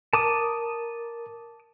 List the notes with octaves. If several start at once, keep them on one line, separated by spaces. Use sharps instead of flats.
A#4 A5 D6 D#6